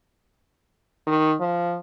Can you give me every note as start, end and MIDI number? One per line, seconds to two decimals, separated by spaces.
1.07 1.34 51
1.40 1.77 53